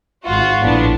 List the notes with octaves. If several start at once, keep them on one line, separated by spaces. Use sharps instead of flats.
G#1 F4 F#4
A#1 A2 B3 D4